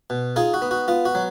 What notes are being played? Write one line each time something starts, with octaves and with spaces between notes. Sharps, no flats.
B2
D#4 F4 G#4
F#4
B3
F#4
B3 F4
F#4
F#3